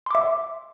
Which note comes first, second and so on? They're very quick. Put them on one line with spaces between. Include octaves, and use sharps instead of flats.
C6 D6 E5